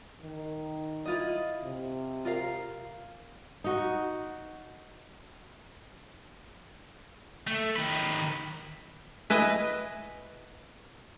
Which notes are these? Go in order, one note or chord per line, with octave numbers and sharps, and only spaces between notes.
D#3
E4 F4 D#5
C3
F4 A#4 F5
D#4 F#4
A3
D#3 B4
E4 B4 D#5 E5 G#5